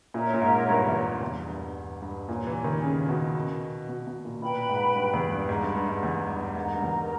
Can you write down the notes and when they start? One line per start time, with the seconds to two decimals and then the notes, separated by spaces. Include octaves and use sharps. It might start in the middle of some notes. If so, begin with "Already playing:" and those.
0.14 A#2 A#4 C#5 E5 A#5
0.34 A#2
0.41 G#2
0.69 G2
0.86 E2
1.04 G2
1.21 E2
1.48 G2
2.02 G2
2.28 A#2 G4 C#5 G#5
2.47 E3
2.64 D#3
2.82 C#3
3.09 B2
3.89 B2
4.07 B2
4.24 A#2
4.42 A#2 B4 G5 B5
4.69 G#2
4.96 G2
5.14 E2
5.31 G2
5.49 G#2
5.63 G2
5.76 G2
5.89 G#2
6.03 E2
6.29 G2
6.56 G#2 A#4 D#5 A#5
6.73 G2
6.83 E2